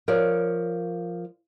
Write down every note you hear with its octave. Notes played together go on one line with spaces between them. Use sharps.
F3 A#4 C#5 D5